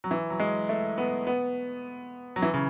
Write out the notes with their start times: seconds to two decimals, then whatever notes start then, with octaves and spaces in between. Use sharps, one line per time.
0.04 F#3
0.11 E3
0.30 F#3
0.40 G#3
0.69 A3
0.98 B3
1.27 B3
2.36 F#3
2.42 E3
2.54 C#3